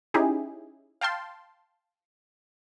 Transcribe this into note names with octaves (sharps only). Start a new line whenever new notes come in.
C#4 D#4 E4 G4 G#4
F5 G5 A5 C6